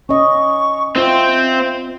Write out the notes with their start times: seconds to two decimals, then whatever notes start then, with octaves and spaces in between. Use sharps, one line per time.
0.09 C#4 D#5 C#6
0.96 C4 F4 C5 E5